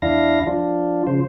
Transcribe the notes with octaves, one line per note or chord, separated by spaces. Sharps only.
E2 D4 E4 F5 A#6
F3 D4 F4
C#3 F3 C5